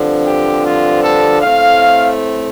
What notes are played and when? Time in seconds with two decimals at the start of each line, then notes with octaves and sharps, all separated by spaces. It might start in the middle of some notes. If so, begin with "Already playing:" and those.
Already playing: G2 D3 F3 C4
0.27 G4
0.65 F4
1.04 A4
1.41 A2 A3 C4 F5